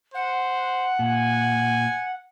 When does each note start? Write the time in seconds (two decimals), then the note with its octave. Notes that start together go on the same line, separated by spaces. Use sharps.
0.14 C5 F#5
0.99 A#2 G#5